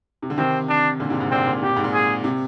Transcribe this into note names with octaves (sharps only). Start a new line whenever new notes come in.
C3
D3
C3 D#3 C4
D4
A#2 D3
G#2 C3
G#2 C3
A#2 C4
A#2
C3 G4
A#2
G#2
A#2
G#4
C3